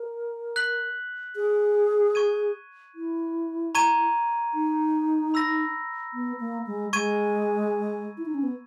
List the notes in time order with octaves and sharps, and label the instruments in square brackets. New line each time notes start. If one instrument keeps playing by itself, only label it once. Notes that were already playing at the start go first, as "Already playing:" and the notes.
Already playing: [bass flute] A#4
[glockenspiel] F#6 B6 F#7
[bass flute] G#4
[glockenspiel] C#6 G#6 D#7
[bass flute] E4
[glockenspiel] A#5 C#6 G#6 D#7
[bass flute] D#4
[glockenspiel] B5 E6 A#6
[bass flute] B3
A#3
G#3
[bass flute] G#3 [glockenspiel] C#6 G#6 D#7
[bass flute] E4
D#4
C#4
B3